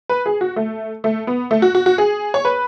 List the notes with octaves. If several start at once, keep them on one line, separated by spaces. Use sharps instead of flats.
B4
G#4
F#4
A3
A3
B3
A3
F#4
F#4
F#4
G#4
C#5
B4